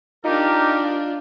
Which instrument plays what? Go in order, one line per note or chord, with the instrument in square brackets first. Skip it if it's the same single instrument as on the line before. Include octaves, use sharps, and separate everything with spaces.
[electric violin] D4 F4 [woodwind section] D#4 G4 A#4